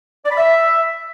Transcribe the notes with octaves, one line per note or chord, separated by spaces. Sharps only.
D5
B5
E5